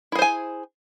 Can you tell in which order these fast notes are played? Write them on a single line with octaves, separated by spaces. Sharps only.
E4 G#4 C5 G#5